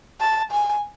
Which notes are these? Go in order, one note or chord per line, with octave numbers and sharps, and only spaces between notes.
A5
G#5